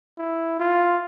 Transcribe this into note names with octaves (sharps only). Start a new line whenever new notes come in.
E4
F4